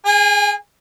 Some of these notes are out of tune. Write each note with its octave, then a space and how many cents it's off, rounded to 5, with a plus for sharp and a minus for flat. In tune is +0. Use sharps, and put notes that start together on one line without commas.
G#4 +0 G#5 -40